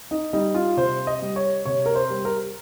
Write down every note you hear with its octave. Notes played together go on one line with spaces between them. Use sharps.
D#4
G3 D#4
F4
C3 C5
D#5
G3
C#5
C3 C#5
A#4
C5
G3
A#4